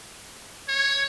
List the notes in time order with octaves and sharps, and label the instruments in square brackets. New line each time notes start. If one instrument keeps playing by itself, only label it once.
[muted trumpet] C#5